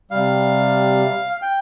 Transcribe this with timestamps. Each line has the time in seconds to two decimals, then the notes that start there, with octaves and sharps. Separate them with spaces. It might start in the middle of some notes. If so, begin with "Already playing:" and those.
0.11 C3 G3 F5
1.42 G5